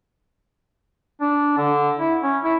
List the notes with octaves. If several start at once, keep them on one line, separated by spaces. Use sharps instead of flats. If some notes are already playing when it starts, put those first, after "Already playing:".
D4
D3
E4
C#4
E4